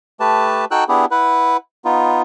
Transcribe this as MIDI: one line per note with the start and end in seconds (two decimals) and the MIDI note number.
0.20 0.65 57
0.20 0.65 67
0.20 0.65 71
0.20 0.65 81
0.71 0.84 63
0.71 0.84 66
0.71 0.84 69
0.71 0.84 79
0.71 0.84 88
0.71 0.84 90
0.89 1.05 59
0.89 1.05 62
0.89 1.05 64
0.89 1.05 67
0.89 1.05 68
1.11 1.57 64
1.11 1.57 71
1.11 1.57 78
1.85 2.22 59
1.85 2.22 63
1.85 2.22 65